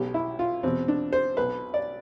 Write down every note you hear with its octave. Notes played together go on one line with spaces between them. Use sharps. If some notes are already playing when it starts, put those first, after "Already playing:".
Already playing: B1 B2 G4
E4
F4
E2 B2 C4
D4
C5
B1 B2 B4
D5